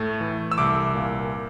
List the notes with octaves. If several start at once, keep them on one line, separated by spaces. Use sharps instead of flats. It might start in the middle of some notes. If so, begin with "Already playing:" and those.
Already playing: A2 A3
E3
E6
C2 D6
A#2